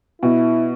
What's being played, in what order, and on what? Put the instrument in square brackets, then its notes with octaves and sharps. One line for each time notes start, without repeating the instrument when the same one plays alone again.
[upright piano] B2 [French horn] E4